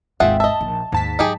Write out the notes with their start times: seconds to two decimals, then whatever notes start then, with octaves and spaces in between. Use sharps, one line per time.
0.20 G#1 D#2 F4 G#4 E5 F#5 G5
0.40 D#5 E5 A5
0.61 A#1
0.92 D#2 G#2 A5 B6
1.19 F#3 D#4 G4 G#4